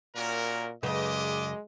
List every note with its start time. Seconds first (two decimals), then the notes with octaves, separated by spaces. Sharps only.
0.15 A#2 C#4 F#4 A#4
0.83 F#2 C#3 G#3 G4 B4 D5 D#5